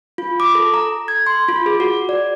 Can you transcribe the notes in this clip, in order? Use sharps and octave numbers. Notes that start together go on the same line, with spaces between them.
F4
D6
A4
A#5
G#6
C6
F4
G#4
F#4
D5